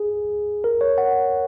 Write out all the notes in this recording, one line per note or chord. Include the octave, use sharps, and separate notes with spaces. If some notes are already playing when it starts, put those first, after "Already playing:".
Already playing: G#4
A#4
C#5
F#5